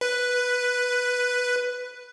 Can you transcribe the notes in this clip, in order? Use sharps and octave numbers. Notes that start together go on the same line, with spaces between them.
B4